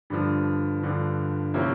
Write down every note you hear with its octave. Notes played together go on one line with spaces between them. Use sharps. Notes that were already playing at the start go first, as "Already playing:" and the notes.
G2 D3 F3
G2 D3 F3
C3 F3 A#3 C#4 E4